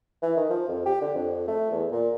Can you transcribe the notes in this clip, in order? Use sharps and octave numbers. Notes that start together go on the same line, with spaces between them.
E3
D#3
F3
F2
G4
D3
F2
A3
E2
A#2